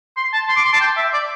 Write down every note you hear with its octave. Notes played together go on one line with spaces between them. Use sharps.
C6
A5
C6
D6
C6
A5
G5
E5
D5